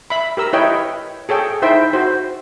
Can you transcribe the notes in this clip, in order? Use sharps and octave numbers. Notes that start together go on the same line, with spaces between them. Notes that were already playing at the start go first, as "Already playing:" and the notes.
E5 B5
G4 A#4 E6
E4 B4 C#5 D#5 G5
G#4 A4 C#5 G5
D#4 E4 C5 E5 G5
F#4 C5